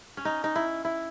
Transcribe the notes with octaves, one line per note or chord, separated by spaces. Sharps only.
C#4
D#4
D#4
E4
E4